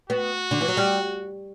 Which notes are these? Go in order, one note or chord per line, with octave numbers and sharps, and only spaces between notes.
B3 F#4
D3
E3
F#3
G3